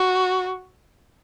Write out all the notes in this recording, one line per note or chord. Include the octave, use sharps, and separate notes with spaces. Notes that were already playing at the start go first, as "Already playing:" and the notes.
Already playing: F#4